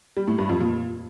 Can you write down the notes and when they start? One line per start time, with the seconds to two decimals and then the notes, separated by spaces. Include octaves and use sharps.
0.17 G3
0.28 A2
0.38 G2
0.49 F2
0.60 A#2